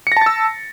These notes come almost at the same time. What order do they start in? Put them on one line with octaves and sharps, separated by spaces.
C#7 A#6 A5 A6 E6